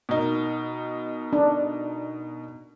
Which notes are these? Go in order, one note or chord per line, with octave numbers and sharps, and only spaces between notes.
B2 D#4 A#4
D4